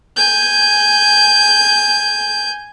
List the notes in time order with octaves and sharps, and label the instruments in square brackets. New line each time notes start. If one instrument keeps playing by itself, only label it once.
[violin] G#5 G6